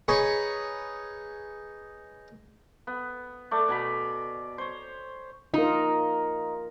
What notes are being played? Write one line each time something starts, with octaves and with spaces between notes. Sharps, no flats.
D#4 G#4 B4 C#5 B5 C#6
B3
A3 D5
B2 G#5 A#5 B5
C5 C#5
D#4 F4 A#4